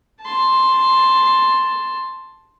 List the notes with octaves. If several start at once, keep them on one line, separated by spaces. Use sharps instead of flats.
A5 C6